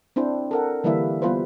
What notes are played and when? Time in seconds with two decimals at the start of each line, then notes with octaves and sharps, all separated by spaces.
0.16 C4 D4 E4 C5
0.51 A4 A#4 F#5
0.84 D3 E3 G3 A#3 E4 E5
1.22 G3 B3 F4 B4 C5